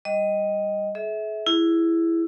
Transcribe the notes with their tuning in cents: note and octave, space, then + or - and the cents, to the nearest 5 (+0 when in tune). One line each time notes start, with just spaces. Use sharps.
G3 +0 D#5 +0
G#4 +45 E5 -20
E4 +10 G#4 -5